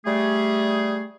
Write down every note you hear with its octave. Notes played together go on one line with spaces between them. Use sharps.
G3 A3 G#4